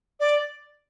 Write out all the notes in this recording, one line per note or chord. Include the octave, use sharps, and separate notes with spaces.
D5